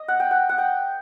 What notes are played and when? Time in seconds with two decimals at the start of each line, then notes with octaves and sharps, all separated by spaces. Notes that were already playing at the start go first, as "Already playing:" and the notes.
Already playing: D#5
0.08 F#5
0.20 G5
0.31 F#5
0.49 F#5
0.58 G5